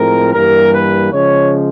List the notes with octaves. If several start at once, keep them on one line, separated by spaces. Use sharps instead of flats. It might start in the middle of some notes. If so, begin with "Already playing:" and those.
Already playing: A2 F3 G#3 C4 A#4
G2 E3 G3 A#3 A#4
B4
C#3 F3 G#3 C#5